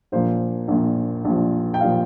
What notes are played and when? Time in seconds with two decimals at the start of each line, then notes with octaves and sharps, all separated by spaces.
0.12 A#1 A#2 F3 C5
0.68 A#1 A#2 F3
1.25 A#1 A#2 F3
1.74 G5
1.81 A#2 F3 F5